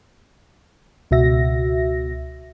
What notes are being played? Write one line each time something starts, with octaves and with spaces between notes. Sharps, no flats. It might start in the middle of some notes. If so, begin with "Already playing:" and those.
C#2 B2 F#4 E5 A#6